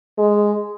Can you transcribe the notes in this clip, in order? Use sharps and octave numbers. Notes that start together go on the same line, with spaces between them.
G#3